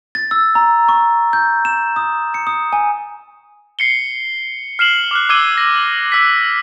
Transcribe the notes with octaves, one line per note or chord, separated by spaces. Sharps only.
A6
E6
A#5
C#6
G6
E7
D#6
C#7
D#6
G#5
C7 C#7 G7
F6 C7 E7 F#7
D6 F6 F#6
D6 E6 G#6 D#7 G7
A#6
E6 F#6 B6